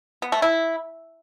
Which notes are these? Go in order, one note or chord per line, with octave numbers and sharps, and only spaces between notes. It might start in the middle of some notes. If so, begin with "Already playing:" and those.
B3
A3
E4